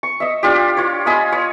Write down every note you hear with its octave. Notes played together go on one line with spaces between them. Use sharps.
C#6
D#5 E5
D4 F4 G4
F4 C#5
D#5 G#5 B5 D#6
C#5